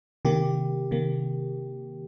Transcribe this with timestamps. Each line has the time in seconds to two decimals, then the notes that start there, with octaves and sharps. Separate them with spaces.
0.25 C3 D#3 A#3 G4
0.91 C3 D#3 A#3